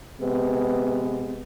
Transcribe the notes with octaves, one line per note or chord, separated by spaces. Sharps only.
C3 G#3 B3